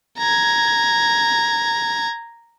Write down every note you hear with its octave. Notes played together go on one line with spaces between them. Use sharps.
A#5 G#6